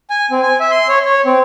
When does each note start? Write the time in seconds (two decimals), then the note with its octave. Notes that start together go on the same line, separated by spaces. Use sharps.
0.10 G#5
0.31 C4
0.43 G#5
0.60 E5
0.71 C6
0.89 C#5
1.05 C#5
1.25 C4